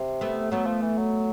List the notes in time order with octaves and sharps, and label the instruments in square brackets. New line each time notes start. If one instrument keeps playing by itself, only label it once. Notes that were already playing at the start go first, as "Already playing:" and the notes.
Already playing: [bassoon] C3
[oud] A3 B3
[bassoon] F#3 [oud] A3 B3
[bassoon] F3
E3
F#3